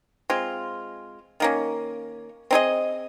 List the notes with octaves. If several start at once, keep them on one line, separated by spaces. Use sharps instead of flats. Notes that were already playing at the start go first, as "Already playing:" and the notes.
G#3 C4 F4
D#3 A#3 C#4
C4 D#4 G#4 D#5